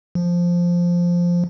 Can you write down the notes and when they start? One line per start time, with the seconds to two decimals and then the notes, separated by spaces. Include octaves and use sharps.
0.15 F3